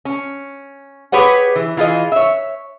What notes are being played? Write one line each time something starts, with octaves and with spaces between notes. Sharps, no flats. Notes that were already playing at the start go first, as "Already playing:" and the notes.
C#4
G4 G#4 B4 C#5 F#5
E3
E3 F4 G#4 D#5
C#5 E5